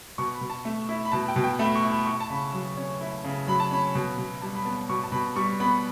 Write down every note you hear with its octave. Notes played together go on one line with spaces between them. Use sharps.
B2 C#6
B5
B2
A5
A3
E4
B5
B2 A5
G5
B2
G5
A3 B5
C#6
E4
B5
E4 C#6
A5
C#3 B5
F#3
C#4
E4
C#3
F#3 B5
A5
C#4 B5
B2
B2
G3 A5
B5
B3 A5
B2 C#6
A5
B2 B5
G3 C#6
B3 B5